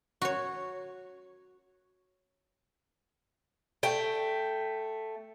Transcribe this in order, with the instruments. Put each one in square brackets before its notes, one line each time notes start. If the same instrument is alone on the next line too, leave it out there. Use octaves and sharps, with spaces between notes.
[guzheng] F#4 C#5
[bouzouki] A3 G5